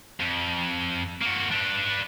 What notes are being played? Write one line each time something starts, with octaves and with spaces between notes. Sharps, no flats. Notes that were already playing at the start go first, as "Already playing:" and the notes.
F2
A#3 F#4
D4 B4